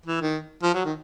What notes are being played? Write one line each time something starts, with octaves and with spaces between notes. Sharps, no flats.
E3
D#3
F3
F#3
D#3